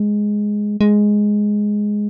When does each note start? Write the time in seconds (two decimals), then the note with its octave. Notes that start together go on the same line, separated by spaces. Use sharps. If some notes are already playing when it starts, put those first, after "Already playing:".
Already playing: G#3
0.81 G#3